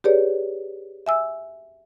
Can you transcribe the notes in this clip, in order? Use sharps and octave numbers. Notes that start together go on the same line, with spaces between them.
G4 G#4 B4 C#5 D5
E5 G#5 E6